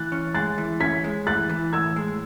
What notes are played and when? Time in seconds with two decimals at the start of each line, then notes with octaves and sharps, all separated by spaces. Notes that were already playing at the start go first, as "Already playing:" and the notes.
Already playing: E3 F#6 A6
0.12 C#4
0.34 G#3 F#6 A6
0.58 E3
0.80 C#4 G#6 B6
1.04 G#3
1.27 E3 F#6 A6
1.49 E3
1.73 A2 E6 G#6
1.96 G#3